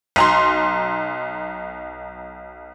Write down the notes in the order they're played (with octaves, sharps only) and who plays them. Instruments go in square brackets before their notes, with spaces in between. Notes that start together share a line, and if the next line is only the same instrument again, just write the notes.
[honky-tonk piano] B1 A#5 C6